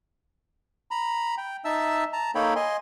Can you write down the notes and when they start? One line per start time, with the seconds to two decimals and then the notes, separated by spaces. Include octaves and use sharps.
0.91 A#5 B5
1.38 G5
1.65 D#4 E5 A5 E6
2.13 A5 A#5
2.35 A#3 D#4 A4 C#5 G5 B5
2.56 D#5 G#5 C6